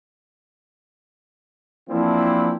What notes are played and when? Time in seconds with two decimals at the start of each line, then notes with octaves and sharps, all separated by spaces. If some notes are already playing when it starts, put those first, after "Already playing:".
1.89 E3 F3 A#3 C4 D4 E4